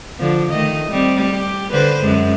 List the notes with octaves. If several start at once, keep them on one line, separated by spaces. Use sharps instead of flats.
D3 F3
D#3 A3 D#5
G3 C4
G4
D3 B4 C5
F#2 G#3